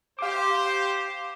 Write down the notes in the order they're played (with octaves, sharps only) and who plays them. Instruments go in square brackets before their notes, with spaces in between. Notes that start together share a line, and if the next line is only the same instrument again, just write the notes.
[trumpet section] G4 C5 [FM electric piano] F5 D6